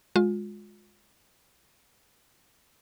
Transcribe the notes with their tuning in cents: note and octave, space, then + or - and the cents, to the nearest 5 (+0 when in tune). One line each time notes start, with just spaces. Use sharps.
G#3 +0 F4 +30